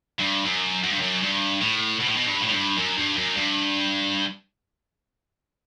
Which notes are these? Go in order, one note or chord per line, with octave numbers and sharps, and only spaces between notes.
G2
F#2
F#2
G2
F#2
G2
A2
B2
A2
B2
G2
A2
G2
F#2
G2
F#2
G2